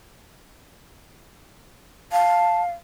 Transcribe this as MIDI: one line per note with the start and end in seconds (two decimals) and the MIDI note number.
2.12 2.70 77
2.12 2.62 81